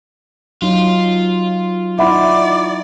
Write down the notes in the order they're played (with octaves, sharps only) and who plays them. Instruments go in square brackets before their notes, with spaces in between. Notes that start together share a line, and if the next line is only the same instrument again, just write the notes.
[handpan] F#3 D#4 [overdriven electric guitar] F4
[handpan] D#4 E4 [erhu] D5 [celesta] E5 F#5 B5